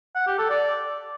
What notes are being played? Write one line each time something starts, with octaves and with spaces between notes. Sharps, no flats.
F#5
G4
A4
D5